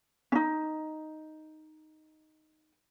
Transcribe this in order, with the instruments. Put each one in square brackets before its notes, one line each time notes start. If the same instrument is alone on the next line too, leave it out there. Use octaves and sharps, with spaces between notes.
[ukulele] C#4 D#4